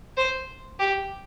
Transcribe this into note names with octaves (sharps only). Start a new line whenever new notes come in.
C5
G4